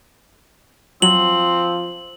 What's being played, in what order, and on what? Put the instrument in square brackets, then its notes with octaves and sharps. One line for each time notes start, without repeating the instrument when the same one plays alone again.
[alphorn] F3 [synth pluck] F#3 [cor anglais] C4 [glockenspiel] F#7